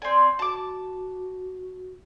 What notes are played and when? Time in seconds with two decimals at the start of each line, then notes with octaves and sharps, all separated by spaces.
0.02 C4 D5 G#5
0.39 F#4 A5 D6